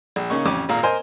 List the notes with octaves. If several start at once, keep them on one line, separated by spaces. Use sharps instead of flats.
A#1
C#3 A#3 C#4 D#4 C#6
A1 F2 C#4 D6
G#1 A#2 F5 A#5
A#4 C5 D#5 G#5